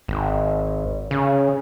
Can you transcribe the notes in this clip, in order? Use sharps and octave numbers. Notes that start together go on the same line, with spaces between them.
G#1
C#3